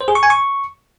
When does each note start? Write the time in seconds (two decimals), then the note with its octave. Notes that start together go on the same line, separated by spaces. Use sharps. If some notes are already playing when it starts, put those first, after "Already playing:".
0.01 C5
0.08 G#4
0.15 C#6
0.23 G#5
0.30 C#6